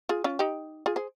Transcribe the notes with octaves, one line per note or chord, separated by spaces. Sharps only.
F4 G#4
C#4 F4
D#4 G4
F4 G#4
G#4 C5